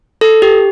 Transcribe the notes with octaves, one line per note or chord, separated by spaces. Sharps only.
A4
G4